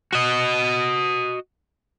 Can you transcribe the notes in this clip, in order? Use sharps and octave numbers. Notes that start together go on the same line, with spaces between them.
F#4 D#5